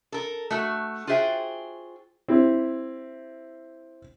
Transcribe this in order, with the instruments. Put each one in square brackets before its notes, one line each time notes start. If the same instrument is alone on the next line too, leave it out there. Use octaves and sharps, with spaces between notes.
[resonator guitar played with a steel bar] A4 A#4
A3 F#4
F4 F#4 G#4 C5 E5 G5
[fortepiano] C4 E4 G4